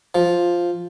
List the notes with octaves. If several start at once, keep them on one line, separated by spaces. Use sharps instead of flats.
F3